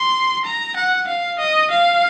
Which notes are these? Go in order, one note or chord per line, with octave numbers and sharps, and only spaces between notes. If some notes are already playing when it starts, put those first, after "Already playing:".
Already playing: C6
A#5
F#5
F5
D#5
F5